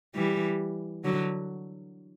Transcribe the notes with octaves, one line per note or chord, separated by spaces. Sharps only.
E3 G3
D3 F#3